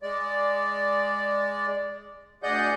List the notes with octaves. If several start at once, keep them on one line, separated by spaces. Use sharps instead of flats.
G#3 D5
D2 G#4 D5 D#5 F#5 G6